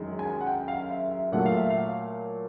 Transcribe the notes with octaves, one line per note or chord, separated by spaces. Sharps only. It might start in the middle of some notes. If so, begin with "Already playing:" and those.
Already playing: F#2 D#3 G#3
G#5
F#5
G5
F5
E5
E5
A#2 F#3 A3 F#5
F5
E5
F5